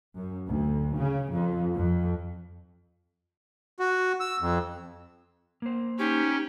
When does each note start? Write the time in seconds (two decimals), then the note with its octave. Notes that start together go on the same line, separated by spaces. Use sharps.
0.16 F#2
0.47 D2
0.97 C#3
1.32 F2
1.75 F2
3.80 F#4
4.20 E6
4.42 F2
5.62 A#3 C5
5.99 C#4 D#4 G4